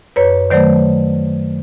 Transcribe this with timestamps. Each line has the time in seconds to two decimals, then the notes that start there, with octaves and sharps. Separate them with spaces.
0.16 F#2 B4 C#5
0.50 D#3 F#3 A3 C5 D5